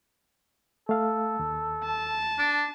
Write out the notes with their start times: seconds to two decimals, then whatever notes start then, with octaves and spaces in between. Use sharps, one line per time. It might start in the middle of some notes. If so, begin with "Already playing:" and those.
0.89 A3 A4 F5
1.39 D#2
1.84 A5
2.38 D4